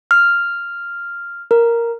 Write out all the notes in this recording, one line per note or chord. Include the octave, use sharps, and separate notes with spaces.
F6
A#4